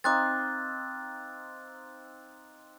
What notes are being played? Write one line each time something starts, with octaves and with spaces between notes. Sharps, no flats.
C4 D#4 F5 D6 F#6 A6